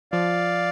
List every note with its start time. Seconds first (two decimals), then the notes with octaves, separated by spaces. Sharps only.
0.12 F3 D5 F5